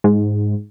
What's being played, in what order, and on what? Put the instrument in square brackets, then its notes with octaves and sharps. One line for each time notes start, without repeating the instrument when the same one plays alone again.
[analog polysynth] G#2